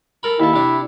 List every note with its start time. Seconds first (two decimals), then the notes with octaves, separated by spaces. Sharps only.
0.23 A4 A#4 B5
0.40 D#2 E4 A4
0.53 C3 D4